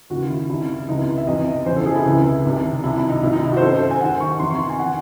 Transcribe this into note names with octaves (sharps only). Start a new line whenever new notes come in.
D#2 C#3 E3 F#4
E4
C2 C3 D#3 E4
C#2 C3 E3 D#4
E4
E5
E2 C3 E3 D#5
E2 C#3 E3 C5
A4
G#4
E4
C#2 C3 E3
C2 C3 D#3
C2 C3 D#3 E4
E4
D#4
C2 C3 D#3 E4
D#4
E4
F#4
C5
F#2 D#3 A4
C5
G#5
D#2 D#3 F#5
C#6
E2 C3 D#3 C6
C#6
C6
G#5
D#3 F#5